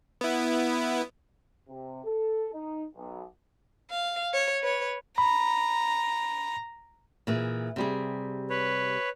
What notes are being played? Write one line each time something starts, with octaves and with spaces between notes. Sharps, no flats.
B3 E4
C3
A4
D#4
B1
F5
C#5
B4 C#5
A#5 B5
A#2 E3 G#4
C3 G3 G#4
B4 C#5